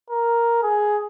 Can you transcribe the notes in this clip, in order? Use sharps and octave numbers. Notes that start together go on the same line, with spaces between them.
A#4
G#4